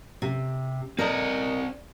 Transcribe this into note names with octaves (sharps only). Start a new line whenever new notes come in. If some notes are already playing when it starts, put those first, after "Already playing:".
C3
C4 A#4 D5 D#5